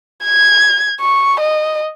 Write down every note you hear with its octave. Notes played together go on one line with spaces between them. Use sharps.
G#6
C#6
D#5